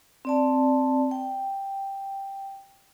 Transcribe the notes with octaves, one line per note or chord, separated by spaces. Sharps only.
C4 D5 A5
G5